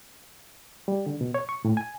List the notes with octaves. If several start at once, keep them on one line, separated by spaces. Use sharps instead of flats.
G3
D3
B2
C#5
C#6
A2
G#5